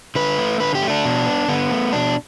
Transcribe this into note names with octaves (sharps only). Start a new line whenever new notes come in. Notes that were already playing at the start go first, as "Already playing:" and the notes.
D3 B4
A3
D3 B4
G4
A3
D4
B2
B3
D3 B3
A3
B2 D4